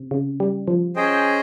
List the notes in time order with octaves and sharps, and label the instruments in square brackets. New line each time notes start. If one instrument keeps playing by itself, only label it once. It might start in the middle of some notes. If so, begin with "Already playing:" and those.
Already playing: [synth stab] C3
C#3
G3
F3
[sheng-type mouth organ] C#4 G#4 C5 D#5 G5